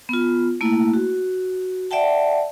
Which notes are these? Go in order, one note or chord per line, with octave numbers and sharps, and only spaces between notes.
B3 F4
A3 A#3 E4
F#4
D5 E5 F#5 G5 A5